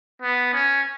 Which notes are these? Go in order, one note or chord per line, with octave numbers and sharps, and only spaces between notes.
B3
C#4